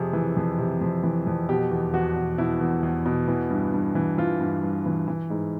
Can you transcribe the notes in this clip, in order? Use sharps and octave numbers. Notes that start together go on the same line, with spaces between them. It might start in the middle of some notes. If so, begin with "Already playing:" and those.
Already playing: F2 C3 G#4
E3
F2
C3
F2
E3
F2
B2 G4
E2
E2 F#4
B2
B2 E4
E2
E2
B2
E3
G2
G2
E3
E3 F4
G2
G2
E3
E3
G#2